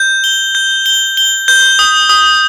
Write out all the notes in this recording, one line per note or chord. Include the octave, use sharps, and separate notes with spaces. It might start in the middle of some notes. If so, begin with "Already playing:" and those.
Already playing: G6
G7
G6
G7
G7
G6
D#6
D#6